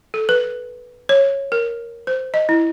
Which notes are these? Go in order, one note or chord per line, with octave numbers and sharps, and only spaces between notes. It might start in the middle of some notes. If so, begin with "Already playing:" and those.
A4
B4
C#5
A#4
C5
D#5
E4